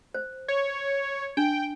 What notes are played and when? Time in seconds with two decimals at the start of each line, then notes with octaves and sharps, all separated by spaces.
0.14 C5
0.48 C#5
1.37 D4 G5